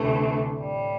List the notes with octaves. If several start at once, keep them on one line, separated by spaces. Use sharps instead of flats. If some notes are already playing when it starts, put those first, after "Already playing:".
Already playing: D2 C3 E3 A3
A2 G3